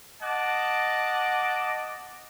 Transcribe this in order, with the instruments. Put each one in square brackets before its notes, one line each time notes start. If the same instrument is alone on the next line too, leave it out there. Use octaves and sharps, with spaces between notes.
[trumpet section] D#5 F#5 A5 D6